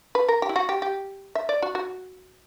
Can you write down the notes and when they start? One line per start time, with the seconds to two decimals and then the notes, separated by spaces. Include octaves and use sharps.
0.15 B4
0.28 A#4
0.42 G4
0.49 E4
0.56 F#4
0.69 G4
0.82 G4
1.35 E5
1.49 D5
1.62 F#4
1.75 F#4